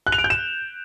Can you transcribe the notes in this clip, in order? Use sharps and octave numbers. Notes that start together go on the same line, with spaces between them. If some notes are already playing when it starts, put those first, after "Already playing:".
F#6
F7
D7
G6
E7